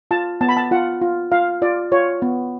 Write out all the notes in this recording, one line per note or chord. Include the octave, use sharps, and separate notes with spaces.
F4 A5
B3 A5
B5
A5
F4 F#5
F4
F4 F5
F4 D5
F4 C#5
B3